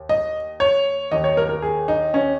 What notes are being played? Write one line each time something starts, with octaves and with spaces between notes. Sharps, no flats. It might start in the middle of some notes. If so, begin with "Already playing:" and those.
Already playing: D#2
D#5
C#5
D#2 D#3 D#5
C#5
A#4
A#4
G#4
D#4
C#4